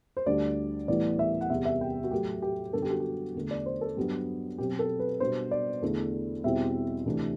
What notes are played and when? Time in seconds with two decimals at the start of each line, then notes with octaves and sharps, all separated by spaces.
0.17 C5
0.26 D2 D3 G3 D4 D5
0.88 A2 E3 G3 B3 E4 D5
1.19 E5
1.41 F#5
1.50 E2 C3 G3 E5
1.65 E5
1.81 G5
2.04 F#4
2.11 A2 F#3 A3 G4
2.42 G4
2.73 F#2 D3 G3 B3 D4 A4
2.82 G4
2.91 F#4
3.00 G4
3.35 E2 D3 A3
3.51 D5
3.66 C5
3.81 A4
3.97 G2 F#3 B3 D4 G4
4.58 B2 F#3 C4 G4
4.79 A4
4.99 B4
5.20 B2 G3 B3 D4 C5
5.51 D5
5.82 E2 D3 A3 E4
6.44 E2 B2 G3 C4 E4 E5
7.06 D2 C3 E3 A3 D4